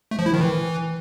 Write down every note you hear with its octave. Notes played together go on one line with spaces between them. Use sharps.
A3
F3
E4
D#3
E3